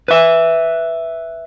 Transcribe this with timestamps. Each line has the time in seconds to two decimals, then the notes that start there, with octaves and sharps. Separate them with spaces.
0.08 B4 E5